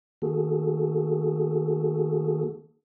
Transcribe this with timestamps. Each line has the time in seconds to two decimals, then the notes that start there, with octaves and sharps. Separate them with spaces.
0.22 D#3 A#3 F#4 G#4 A4